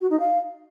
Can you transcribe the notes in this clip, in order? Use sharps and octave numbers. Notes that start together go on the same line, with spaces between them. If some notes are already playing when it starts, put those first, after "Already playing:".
F#4
D#4
F5